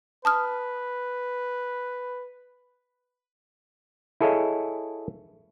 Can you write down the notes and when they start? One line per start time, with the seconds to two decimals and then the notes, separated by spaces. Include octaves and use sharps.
0.25 B4 A5 D#6 F6
4.21 E4 G#4 A4 C#5 D#5 F5